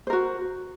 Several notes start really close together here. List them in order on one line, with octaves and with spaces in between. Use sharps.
C5 A#4 F#4